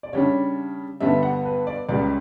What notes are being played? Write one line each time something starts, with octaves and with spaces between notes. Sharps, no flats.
D5
C#3 G3 D4 C#5
G2 D3 G3 B3 D4 E5
F#5
B4
D5
C#2 C#3 G3 D5